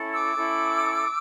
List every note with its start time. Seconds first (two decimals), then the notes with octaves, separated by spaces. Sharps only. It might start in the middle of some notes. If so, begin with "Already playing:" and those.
Already playing: C#4 E4 A4
0.13 D6 E6
0.36 C#4 E4 A4